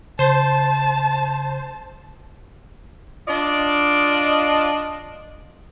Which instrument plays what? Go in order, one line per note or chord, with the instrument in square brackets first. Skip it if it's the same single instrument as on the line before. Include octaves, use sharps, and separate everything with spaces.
[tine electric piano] C#3 [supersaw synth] C5 [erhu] A5
[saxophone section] D4 F4 D5 D#5